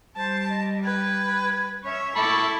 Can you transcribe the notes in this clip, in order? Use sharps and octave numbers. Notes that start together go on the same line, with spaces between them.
G3 C5 A5
D#5
B4 G5 G#6
C#4 C#5 E5
C#4 E4 A4 E5 A5 B5 C#6 D6